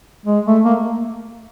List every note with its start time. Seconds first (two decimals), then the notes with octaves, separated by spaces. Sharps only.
0.26 G#3
0.46 A3
0.65 A#3